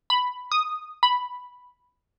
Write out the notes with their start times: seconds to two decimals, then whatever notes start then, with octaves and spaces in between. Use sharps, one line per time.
0.10 B5
0.52 D#6
1.03 B5